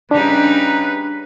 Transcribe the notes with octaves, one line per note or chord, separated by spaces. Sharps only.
C#3 G3 D4 D#4 B4